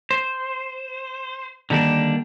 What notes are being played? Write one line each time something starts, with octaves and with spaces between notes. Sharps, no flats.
C5
D3 D#3 G3 A#3 D4